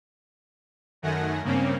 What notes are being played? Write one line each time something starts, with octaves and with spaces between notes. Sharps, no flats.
F#2 D#3 A3 F#5 G#5 A#6
G2 C#3 A#3 C4 C#4